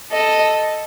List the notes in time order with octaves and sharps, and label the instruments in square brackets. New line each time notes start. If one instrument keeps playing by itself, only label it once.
[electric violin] A4 [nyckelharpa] D#5